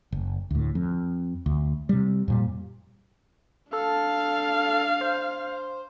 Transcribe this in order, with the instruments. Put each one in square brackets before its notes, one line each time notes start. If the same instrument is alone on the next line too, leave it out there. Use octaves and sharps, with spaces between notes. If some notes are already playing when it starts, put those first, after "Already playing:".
[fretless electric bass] F#1
D2 A2
F2
D2
C3 G3
F2 A#2 G3
[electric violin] D4 F5 [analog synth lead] A4
[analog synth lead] C5